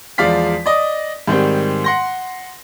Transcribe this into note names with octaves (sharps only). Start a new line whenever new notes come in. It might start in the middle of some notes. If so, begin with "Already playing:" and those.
E2 F3 G#3 D5 F5 B6
D5 D#5
G#2 D#3 G3 C4
F#5 C6 A#6